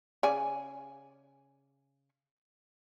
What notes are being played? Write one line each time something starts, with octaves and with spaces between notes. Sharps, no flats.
C#3 D5 G#5